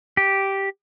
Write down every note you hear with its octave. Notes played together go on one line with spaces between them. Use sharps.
G4